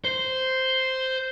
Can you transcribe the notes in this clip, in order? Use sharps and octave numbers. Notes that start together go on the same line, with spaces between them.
C5